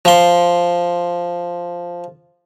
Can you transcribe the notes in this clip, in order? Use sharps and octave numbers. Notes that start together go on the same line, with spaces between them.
F3 C6